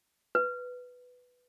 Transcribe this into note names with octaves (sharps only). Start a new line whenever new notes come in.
B4